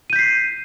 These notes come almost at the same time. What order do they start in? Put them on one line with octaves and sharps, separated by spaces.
D#7 G6 B6 C7